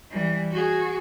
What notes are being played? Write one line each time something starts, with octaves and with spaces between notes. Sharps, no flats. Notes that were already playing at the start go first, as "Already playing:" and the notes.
E3 G3
F#4 G#4